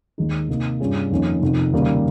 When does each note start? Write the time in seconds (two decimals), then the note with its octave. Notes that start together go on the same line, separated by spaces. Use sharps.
0.18 D#2 D#3 G#3 D#4
0.49 C3 D#3 A#3 D#4
0.80 G2 G3 C#4 F4 G#4
1.11 F2 D#3 A#3 C#4
1.42 F2 C3 D#3
1.73 D#2 C#3 G3 A#3